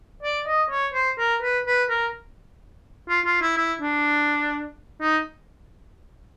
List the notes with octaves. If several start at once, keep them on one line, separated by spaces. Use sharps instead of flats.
D5
D#5
C#5
C5
A#4
B4
B4
A#4
F4
F4
E4
E4
D4
D#4